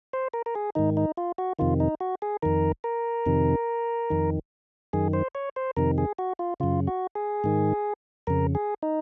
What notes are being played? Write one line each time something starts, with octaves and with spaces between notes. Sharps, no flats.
C5
A#4
A#4
G#4
G#2 D#3 D#4
D#4
F4
F#4
F2 C3 D#3 F4
D#4
F#4
G#4
F2 D#3 A#4
A#4
F2 C3 D#3
F2 D#3
F#2 D#3 G#4
C5
C#5
C5
F2 C3 D#3 A#4
G#4
F#4
F4
F#2 C#3 F4
F#4
G#4
G#2 D#3
F2 C#3 A#4
G#4
D#4